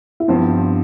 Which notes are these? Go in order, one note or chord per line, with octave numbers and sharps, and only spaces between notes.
E4
G2 F3 B3 C4 D4